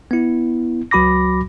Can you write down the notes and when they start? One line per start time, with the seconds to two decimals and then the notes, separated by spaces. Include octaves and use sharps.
0.11 B3 E4
0.91 C#2 F#3 F#4 B5 D6 A#6